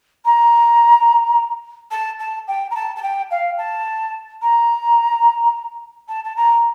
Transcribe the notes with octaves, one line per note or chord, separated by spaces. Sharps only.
A#5
A5
A5
G5
A#5
A5
A5
G5
F5
A5
A#5
A5
A5
A#5